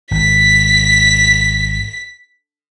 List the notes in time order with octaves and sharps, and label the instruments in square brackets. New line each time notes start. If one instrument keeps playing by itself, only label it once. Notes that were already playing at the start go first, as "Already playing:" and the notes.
[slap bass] G#1 [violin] B6